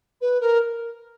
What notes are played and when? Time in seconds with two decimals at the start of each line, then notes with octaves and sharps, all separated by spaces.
0.21 B4
0.40 A#4